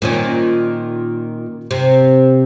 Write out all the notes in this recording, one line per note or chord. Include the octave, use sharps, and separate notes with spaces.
A#2 D#3 C#4
C3